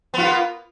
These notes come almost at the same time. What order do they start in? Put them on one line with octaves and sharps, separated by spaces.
B3 F4 A#3